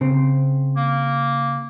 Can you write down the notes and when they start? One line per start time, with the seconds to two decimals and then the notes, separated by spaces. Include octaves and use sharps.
0.01 C#3 C4
0.76 A#3